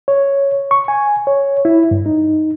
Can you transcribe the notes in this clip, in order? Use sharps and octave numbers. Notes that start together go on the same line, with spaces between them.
C#5
C#6
G#5
C#5
E4
G2
D#4